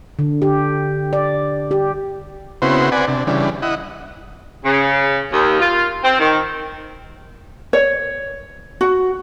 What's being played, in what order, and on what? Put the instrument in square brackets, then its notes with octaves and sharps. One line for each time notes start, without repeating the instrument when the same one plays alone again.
[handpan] D3
G4
D5
G4
[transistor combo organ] C#3 B3 C4 E4 F#4 C5
C4 B4 D5 F#5 G#5
C3 D4
C#3 E3 G3 D4
E4 D#5 F#5
[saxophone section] C#3
D#2
F4
C4
D#3
[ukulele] C#5
F#4